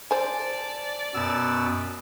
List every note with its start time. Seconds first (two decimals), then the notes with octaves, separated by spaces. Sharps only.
0.11 C5 D5 G#5 A5
1.15 F#2 B2 B3 E6